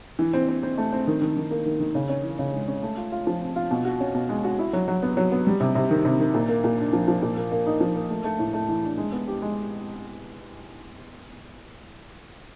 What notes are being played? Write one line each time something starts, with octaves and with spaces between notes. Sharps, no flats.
E3
C4
C4
C4
A3
C4
D#3
D#3
D#3
A#3
D#3
D#3
C#3
C#4
E3
C#3
G#3
C#4
A3
F4
F4
F3
C4
F4
B2
F#4
C#4
B2
G#3
F#4
E4
F#3
F#3
B3
F#3
B3
G3
C3
C3
D#3
C3
D#3
A#2
A#3
A#2
D4
F3
F3
A#2
A#3
A#3
D#4
F3
A#3
A3
A3
A2
A3
E3
D4
G#3
B3
G4
G#3